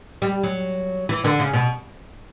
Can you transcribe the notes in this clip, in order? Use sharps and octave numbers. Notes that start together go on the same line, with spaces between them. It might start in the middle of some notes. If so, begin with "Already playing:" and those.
G3
F#3
E3
D3
C#3
B2